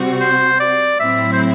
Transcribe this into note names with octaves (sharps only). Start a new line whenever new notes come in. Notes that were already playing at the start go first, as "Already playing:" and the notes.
Already playing: C3 G3 C4 F#4
C5
D5
A2 F#3 C4 E4 E5
C5